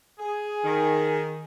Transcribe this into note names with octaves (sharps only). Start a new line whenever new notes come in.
G#4
D#3